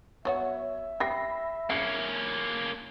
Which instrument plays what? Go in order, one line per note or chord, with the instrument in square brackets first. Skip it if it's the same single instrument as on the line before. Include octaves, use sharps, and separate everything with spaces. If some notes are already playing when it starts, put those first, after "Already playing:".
[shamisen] F#3 B3 F#4 [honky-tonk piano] C#5 [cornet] E5
[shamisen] G4 G5 [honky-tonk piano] B5 A#6 C7
[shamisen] C#3 [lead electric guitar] A#3 C#4 [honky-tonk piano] C7 C#7